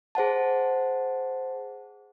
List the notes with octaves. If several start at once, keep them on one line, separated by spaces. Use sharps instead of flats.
G#4 C5 F#5 A5